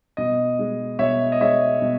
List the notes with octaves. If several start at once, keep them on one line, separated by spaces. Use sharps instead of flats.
B2 D#5
G#3
B2 C#5 E5
D#5
G#3 C#5 E5
B2